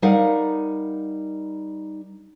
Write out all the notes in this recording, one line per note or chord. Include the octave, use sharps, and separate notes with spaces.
G3 D#4 A#4 F5 F#5